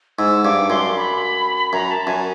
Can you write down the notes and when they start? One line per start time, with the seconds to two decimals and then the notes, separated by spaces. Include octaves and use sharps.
0.18 G#2 E6
0.45 G2 D6
0.70 F#2 C6
0.96 B5
1.73 F#2 A#5
1.90 A5
2.07 F#2 G#5